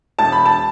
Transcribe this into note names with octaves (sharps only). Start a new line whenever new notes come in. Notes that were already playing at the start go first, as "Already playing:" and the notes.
E1 A5
B5
A5